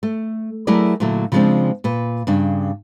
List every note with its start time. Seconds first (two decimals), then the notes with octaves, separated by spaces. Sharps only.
0.03 A3
0.67 F#3 A3 E4 G#4 A#4 D5
1.00 A#2 D3 F#3 A3 E4
1.32 C#3 F3 G#3 B3 C4 D4
1.84 A#2 B4
2.27 G2 C#3 D4